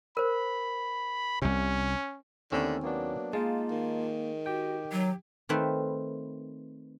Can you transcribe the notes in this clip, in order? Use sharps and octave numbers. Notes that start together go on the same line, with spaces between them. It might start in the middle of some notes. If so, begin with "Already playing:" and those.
A#4 C5 B5
C2 C3 C#4
D#2 D3 A3 C4 C#4 A#4 E6
F#3 A#3 B3 D4
G#3 A#3 D#4 F4 A5
D#3
F#4 G4 G5
F#3
D#3 A3 C4 B4